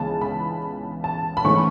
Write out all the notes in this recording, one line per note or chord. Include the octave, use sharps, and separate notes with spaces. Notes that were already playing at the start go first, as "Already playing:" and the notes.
Already playing: C#2 C#3 E3 B3 A5
B5
A5
B5
G#2 E3 A3 C#4 C#6